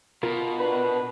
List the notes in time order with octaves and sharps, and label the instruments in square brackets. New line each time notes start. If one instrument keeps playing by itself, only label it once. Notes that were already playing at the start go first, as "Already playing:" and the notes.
[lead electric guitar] B2 [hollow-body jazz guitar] F4 A#4
[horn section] D4 B4